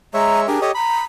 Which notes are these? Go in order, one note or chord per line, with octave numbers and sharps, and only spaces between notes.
G#3 C#5 E5 A#5
D4 G4 G#4 A#4
G4 A4 C#5 D#5
A#5 B5